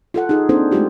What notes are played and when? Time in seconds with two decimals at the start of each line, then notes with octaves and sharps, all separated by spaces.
0.14 F4 A4 F#5
0.29 D#4 G#4
0.49 A#3 C4 D4 D#4 A4 C5
0.72 G#3 A3 E4 F4 G4